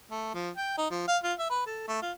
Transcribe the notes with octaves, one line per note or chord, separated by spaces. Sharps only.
A3
F3
G5
D#4
F3
F5
F4
E5
B4
A4
A3
F4